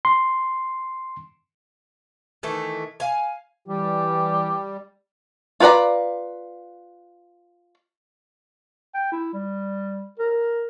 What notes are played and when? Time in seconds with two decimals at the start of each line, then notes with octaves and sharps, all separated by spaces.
0.05 C6
2.43 D#3 E3 A3
3.00 F5 G#5
3.68 E3 G3 G4
5.60 F4 A#4 B4 D5 A#5
8.95 G5
9.12 E4
9.33 G3
10.19 A#4